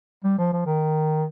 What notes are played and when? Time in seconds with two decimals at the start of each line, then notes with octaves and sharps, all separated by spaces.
0.24 G3
0.39 F3
0.53 F3
0.66 D#3